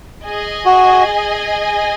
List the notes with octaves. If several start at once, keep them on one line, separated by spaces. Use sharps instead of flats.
G#4 D#5 G#5
F#4